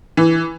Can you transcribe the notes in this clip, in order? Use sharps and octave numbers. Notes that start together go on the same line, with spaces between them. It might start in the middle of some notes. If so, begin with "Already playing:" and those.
E3